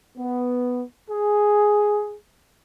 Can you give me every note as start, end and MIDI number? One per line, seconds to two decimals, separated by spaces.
0.17 0.83 59
1.11 2.17 68